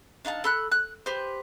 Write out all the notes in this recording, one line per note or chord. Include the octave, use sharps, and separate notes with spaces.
D4 D#4 F5 A5
A4 B5 F#6
F#6
G4 B4 C5